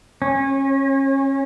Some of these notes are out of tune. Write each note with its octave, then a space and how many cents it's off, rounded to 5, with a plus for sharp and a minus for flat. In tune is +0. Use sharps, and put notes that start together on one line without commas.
C#4 -30